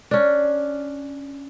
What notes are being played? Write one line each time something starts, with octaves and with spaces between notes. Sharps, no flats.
C#4 D4